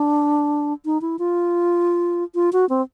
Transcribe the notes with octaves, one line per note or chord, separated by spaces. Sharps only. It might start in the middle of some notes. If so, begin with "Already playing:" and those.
Already playing: D4
D#4
E4
F4
F4
F#4
C4